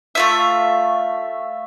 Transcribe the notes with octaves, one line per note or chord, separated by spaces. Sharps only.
A3 F4 E5